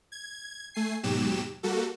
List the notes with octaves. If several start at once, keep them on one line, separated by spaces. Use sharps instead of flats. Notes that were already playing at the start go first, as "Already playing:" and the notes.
G#6
A3 G#5 C7
D#2 G#2 B2 F#3 G4 E7
G3 A#3 F#4 A4